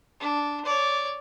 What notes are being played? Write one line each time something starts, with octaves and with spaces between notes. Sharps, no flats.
D4
C#5 D5